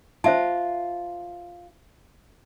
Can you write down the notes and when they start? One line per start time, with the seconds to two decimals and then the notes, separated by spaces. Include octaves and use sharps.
0.24 F4 C5 E5 A5